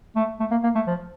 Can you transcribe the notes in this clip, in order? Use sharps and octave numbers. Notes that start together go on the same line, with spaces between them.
A3
A3
A#3
A#3
A3
F3